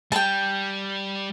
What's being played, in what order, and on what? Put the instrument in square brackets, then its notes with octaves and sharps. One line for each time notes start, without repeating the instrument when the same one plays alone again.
[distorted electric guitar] G3 [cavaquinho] G5 A5